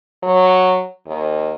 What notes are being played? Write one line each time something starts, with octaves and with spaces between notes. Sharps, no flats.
F#3
D#2